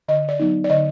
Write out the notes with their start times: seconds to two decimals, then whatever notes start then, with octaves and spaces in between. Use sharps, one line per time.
0.08 D3 D#5
0.29 D5
0.39 F#3 B3 D#4
0.64 D5
0.70 D3 D#5